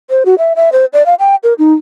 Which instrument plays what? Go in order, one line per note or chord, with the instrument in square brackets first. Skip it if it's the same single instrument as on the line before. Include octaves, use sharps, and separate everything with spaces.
[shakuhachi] C5
F#4
E5
E5
C5
D5
F5
G5
A#4
D#4